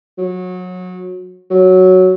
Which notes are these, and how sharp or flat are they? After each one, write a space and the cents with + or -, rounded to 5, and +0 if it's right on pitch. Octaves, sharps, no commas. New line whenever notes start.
F#3 -25
F#3 +0